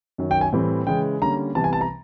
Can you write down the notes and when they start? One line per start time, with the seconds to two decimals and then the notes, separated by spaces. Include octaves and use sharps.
0.18 F#2 D#3 F#3
0.31 G5
0.41 G#5
0.52 A2 E3 G3 C4
0.87 C#3 E3 G#3 C#4 G5
1.22 D3 G3 A#3 C#4 A#5
1.55 C3 E3 G3 B3 A5
1.64 G#5
1.73 A5
1.81 A#5